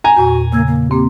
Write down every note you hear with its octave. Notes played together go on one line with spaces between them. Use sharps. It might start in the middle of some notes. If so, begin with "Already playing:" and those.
G#5 A#5
E2 A#2 F#4
C#3 A#3 E6 G#6
A#3
A#3 C4 G4